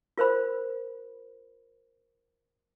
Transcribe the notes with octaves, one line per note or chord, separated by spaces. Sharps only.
F4 A#4 C5 B5